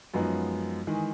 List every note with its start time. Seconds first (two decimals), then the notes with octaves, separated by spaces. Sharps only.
0.14 F#2 F3 G#3 B3 D#4
0.87 D#3 E3 G#3